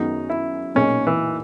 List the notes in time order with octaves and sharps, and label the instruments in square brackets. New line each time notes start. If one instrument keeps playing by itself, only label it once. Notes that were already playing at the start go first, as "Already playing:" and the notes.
Already playing: [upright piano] F#2 D#3 G#3 B3 F#4 [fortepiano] D#4
[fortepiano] E4
[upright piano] B1 A#2 G#3 D#4 [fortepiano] C#4
[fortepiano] E3